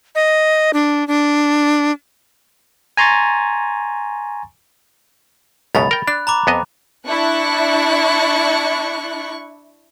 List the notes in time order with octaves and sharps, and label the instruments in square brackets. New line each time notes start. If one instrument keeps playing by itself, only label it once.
[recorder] D#5
D4
D4
[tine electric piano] G#5 A#5 C6 C#6 A6
[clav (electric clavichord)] C#2 F#2 B2 [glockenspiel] B5 A6
[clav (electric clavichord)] A#4 G5
[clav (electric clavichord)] D4 [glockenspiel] F#6
[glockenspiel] A#5 B5 D6
[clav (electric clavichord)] F2 B3 D#5
[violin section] D4 E4 C#6 F#6